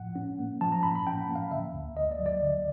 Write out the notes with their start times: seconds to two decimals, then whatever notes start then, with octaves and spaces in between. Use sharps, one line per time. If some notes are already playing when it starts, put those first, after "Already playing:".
Already playing: A2 F3 F#5
0.16 C#4
0.39 A#3
0.61 F3 A5
0.72 A#5
0.83 A2 B5
0.95 B5
1.07 C#4 G5
1.21 F#5
1.29 A#3
1.35 F5
1.51 D3 E5
1.74 D2
1.96 D2 D#5
2.11 D5
2.19 F#3
2.26 D5
2.42 D3